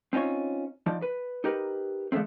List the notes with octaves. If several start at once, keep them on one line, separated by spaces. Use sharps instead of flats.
C4 C#4 D#4 F4 C#5
F3 D#4 D5
B4
D#4 G4 A#4 B4
D3 F3 G#3 A3 C4